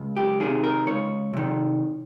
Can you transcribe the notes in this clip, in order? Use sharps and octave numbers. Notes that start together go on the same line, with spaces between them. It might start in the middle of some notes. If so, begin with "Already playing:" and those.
Already playing: C#2
G4
C3 D#3 G#4
A#4
C#2 C#5
C3 D#3